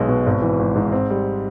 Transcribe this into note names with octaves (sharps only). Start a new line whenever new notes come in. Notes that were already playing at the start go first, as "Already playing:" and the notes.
Already playing: B1 G#3 B3
B2
G#1
E3
G#1
G#2
C4
G3